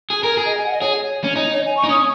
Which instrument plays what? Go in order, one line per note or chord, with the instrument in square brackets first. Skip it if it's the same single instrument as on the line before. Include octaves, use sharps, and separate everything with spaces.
[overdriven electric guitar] G#4
A#4
G#4
[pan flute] D#5
G#5
F#5
D#5
[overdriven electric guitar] G#4 [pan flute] C#5
[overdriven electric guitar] C#4
D#4
[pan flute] C#5
G#5
C#6
[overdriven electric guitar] D#4
[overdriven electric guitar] C#4 [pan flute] D#6